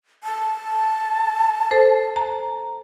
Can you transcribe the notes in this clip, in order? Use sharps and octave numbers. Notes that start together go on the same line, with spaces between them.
A5
A4 C5
A#5